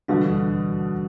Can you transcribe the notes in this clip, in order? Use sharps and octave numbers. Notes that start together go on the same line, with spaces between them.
B2 D3 E3 G3 D4